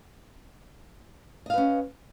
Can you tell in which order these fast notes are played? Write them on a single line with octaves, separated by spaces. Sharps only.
D#5 F5 B4 C#4